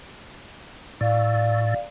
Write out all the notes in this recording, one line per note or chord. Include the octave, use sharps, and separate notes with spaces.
A2 D5 F5